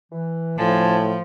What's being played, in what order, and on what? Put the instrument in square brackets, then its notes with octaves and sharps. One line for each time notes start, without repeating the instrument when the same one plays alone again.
[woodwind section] E3
[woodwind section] D2 G#5 A5 [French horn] A2 [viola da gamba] F3